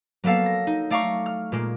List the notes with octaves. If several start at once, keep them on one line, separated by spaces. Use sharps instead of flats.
F#3 A#3 B3 A4 F5
A#6
D#4
A3 D5 F5 A#5 C#6
F6
A#2 G#3 A#3